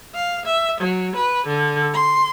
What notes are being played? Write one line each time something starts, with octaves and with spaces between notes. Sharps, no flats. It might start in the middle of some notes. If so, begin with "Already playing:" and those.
F5
E5
F#3
B4
D3
C6